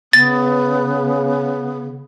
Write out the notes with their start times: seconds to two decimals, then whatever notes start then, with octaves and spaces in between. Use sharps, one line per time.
0.13 C#3 B3 A6